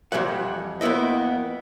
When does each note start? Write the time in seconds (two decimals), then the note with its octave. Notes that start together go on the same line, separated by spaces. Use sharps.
0.12 F2 G#2 E3 G3 F#5
0.81 F2 A#3 B3 E4 D#5